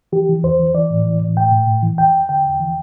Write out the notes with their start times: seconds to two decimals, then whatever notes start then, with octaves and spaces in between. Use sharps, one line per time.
0.12 E3 G4
0.29 E3
0.43 E2 C5
0.59 E3
0.74 E3 D5
0.90 A2
1.06 E3
1.21 A2
1.37 A2 G5
1.51 A2
1.67 A2
1.82 E3
1.98 E2 G5
2.14 E2
2.29 D3 G5
2.44 E2
2.60 E3